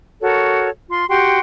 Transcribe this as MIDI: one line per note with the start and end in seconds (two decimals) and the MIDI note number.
0.21 0.69 66
0.21 0.69 69
0.21 0.69 70
0.21 0.69 73
0.89 1.05 65
0.89 1.05 84
1.08 1.39 66
1.08 1.39 67
1.08 1.39 79
1.08 1.39 84